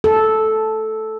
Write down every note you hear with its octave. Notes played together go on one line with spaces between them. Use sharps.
A4